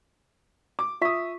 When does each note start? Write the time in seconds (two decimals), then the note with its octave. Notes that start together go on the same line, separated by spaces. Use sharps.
0.79 D6
1.02 F4 E5 C#6 D#6 B6